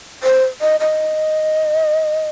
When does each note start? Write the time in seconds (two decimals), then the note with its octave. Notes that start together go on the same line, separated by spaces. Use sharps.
0.23 C5
0.61 D#5
0.80 D#5